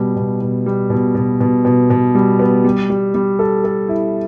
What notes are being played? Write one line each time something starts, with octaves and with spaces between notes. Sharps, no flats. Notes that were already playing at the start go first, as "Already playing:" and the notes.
Already playing: B2 G3
B2
B2
G3
B2
B2
B2
B2
B2
G3
B3
G3
G3
G3
A4
A4
E4